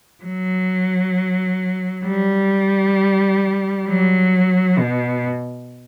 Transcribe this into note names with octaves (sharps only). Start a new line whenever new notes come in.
F#3
G3
F#3
B2